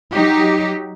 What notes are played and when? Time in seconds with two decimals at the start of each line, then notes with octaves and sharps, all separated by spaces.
0.13 F#3 D#4 G4